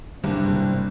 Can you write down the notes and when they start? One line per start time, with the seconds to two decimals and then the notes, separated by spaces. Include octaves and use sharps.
0.24 F#1 G2 C3 G3 C4 D4